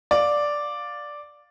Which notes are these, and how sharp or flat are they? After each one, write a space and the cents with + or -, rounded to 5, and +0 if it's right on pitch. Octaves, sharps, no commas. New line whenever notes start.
D5 +0 F5 +15